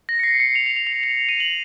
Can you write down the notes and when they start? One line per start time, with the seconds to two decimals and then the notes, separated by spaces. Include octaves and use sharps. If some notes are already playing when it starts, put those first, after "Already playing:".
0.09 A#6
0.19 C#7
0.23 C7
0.35 C7
0.40 C#7
0.55 F7
0.66 F7
0.76 F7
0.87 F7
1.03 F7
1.29 D#7
1.40 F#7